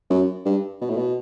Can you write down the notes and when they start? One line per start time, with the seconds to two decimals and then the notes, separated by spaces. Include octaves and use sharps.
0.10 F#2
0.45 G2
0.81 B2
0.90 A2
0.97 B2